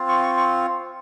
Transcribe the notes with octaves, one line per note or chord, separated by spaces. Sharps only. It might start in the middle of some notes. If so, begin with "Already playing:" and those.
Already playing: C4 F4
C#6
C#6
C#6